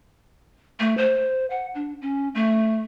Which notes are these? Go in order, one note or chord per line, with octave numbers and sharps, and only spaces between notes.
A3
C5
F#5
D4
C#4
A3